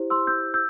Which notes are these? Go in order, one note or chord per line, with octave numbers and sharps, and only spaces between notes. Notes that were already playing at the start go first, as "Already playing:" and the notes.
Already playing: E4 G4 C5
C6 E6
E6 G6
E6 G6